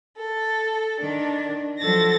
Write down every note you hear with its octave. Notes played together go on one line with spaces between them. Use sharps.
A4
D#3 D4
F3 F#3 A4 A6 A#6